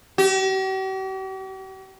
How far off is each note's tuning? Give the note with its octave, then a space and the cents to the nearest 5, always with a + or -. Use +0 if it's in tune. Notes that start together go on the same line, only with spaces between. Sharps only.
G4 -45